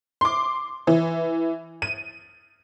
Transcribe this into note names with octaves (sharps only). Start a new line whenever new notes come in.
C6 D6
E3
D#7